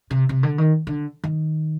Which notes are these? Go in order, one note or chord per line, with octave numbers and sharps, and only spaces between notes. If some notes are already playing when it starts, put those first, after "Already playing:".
C3
C3
D3
D#3
D3
D#3